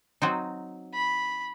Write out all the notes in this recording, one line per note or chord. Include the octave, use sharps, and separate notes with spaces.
F#3 C4 D#4
B5